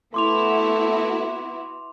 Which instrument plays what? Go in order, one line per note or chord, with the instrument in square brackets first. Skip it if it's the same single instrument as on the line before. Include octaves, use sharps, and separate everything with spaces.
[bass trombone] A3 [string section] B3 E4 F#4 [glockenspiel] C6 D6 F7